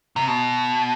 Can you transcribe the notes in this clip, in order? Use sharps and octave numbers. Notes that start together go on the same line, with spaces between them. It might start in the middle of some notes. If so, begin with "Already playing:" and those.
C3
B2